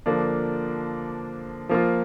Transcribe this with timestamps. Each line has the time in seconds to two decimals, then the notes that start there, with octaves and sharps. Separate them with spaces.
0.06 D3 F3 A#3 D4
1.69 F3 A#3 F4